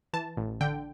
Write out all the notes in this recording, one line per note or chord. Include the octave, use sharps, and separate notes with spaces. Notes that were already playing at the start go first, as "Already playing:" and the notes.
E3 A5
A1
D3 G5